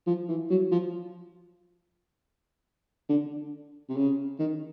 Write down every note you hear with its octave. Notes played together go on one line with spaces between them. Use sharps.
F3
E3
F#3
F3
D3
C3
C#3
D#3